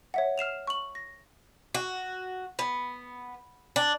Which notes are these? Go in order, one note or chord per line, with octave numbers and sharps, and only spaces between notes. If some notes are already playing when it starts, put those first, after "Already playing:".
C#5 E5 F#5
F6 C7 E7 F7
C#6 F#7
A#6
F#4
B3
D4